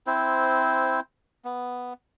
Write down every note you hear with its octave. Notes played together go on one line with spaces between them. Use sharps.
C4 E4 C5
B3